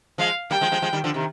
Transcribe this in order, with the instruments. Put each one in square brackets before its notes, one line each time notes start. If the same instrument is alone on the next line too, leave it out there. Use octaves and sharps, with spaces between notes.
[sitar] F3 G#3 [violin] F5
[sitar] G3 A#3 [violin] G5
[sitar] F3 G#3
F3 G#3
F3 G#3
D#3 G3
D3 F3
C3 D#3